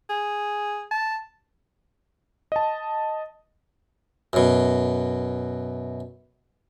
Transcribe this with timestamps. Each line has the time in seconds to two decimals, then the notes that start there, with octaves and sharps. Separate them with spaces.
0.10 G#4
0.91 A5
2.52 D#5 A5
4.33 F#2 B2